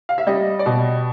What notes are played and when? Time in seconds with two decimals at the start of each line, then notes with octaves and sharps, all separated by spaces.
0.09 F5
0.18 E5
0.27 G3 D#5
0.59 D5
0.66 B2 D#5